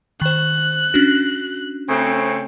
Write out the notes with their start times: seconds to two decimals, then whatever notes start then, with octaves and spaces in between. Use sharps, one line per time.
0.22 D#3 C5 F#6
0.94 C#4 D4 F#4
1.89 C#3 A3 C4